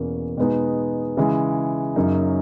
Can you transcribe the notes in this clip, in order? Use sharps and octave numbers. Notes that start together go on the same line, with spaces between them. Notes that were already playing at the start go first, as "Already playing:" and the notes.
Already playing: E2 B2 A#3 C#4
B2 G#3 B3 D#4
C#3 E3 G#3
F#2 C#3 F#3 A#3 C#4 D#4